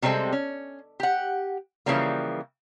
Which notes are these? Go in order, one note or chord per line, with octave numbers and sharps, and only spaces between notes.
C3 G3 G#3 C4 A4
C#4
G4 F#5
C#3 E3 F3 G3 A#3